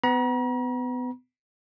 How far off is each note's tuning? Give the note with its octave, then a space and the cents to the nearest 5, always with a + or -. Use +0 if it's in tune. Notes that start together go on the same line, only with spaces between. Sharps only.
B3 +30 A#5 +45